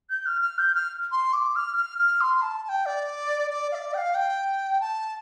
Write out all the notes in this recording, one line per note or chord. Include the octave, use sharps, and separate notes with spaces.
G6
F6
F6
G6
F6
C6
D6
F6
F6
F6
C6
A5
A5
G5
D5
D5
F5
D5
G5
F5
G5
A5